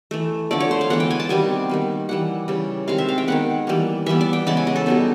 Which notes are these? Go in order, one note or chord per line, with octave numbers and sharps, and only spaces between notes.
E3 A3
D3 F3 A3 D5
C#5
C5
F5
E3 G#3 B3 F#5
G5
G#5
A5
C3 D#3 G3 B3 G#5
D#3 G3 A#3
E3 G3 A#3 F#5
C#3 E3 G3
C3 D#3 G#3 F5
E5
F5
G5
D#3 G#3 B3 F#5
E3 G3 A#3
E3 G3 B3 E5
D5
G5
C#3 E3 G#3 B3 A5
G#5
D#5
A4
B2 G3 B3 D#4